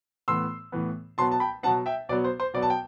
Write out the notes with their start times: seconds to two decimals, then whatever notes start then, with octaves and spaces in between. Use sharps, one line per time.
0.28 A2 E3 B3 C6 E6
0.72 A2 E3 B3
1.18 B2 F#3 B3 A5 C6
1.32 A5
1.40 G5 B5
1.63 B2 F#3 B3 F#5 A5
1.86 E5 G5
2.09 B2 F#3 B3 D5
2.24 C5
2.40 C5
2.54 B2 F#3 B3 D5
2.62 A5
2.70 G5